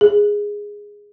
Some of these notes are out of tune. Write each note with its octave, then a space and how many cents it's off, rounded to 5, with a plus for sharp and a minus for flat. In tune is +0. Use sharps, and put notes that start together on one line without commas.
G#4 -10